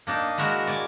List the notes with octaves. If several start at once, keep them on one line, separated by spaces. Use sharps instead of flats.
A#3 D4 D#4
G#3 E4 F#4 A#4
D5 G#5